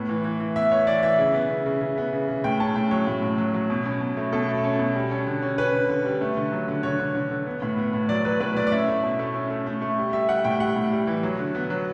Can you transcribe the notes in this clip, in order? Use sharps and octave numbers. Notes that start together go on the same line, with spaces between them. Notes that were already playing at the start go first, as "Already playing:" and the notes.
Already playing: A2 B3
E3
E3
E3
B3 E5
B3 C#5
E3 D5
E3 E5
C#3
B3
C#3
C#3
C#3
B3
C#3
C#3
A2 G5
C#4 A5
A2 G5
F#3 C#5
A2
A2
F#3
F#3
B2
C#4
B2
A3
B2 A4
A3
C#4
B2
G3
C#4
D3
C#4
C#4 B4
D3
D3
G3
A3
D3
F#3
D3
D3 C#5
D3
D3
D3
B3
A2
B3
A2
F#3 D5
F#3 B4
A2 B4
A2 D5
D5
C#4 E5
A3
B2
A3
C#4
A3
A3
A3
G3
G3 E5
G3 F#5
A2 G5
G3 F#5
A2
G3
E3
F#3
D3
B3
F#3